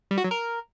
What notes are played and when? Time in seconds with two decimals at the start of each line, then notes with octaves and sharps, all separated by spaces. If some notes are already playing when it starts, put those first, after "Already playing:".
0.11 G3
0.17 F#4
0.24 F#3
0.31 A#4